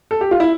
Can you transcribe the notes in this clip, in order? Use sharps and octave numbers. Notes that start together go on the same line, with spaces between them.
A4
G4
F4
E4